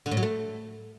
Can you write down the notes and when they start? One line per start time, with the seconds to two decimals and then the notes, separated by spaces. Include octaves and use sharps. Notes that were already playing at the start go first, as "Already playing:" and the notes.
0.06 D3
0.11 A2
0.17 F#3
0.23 A3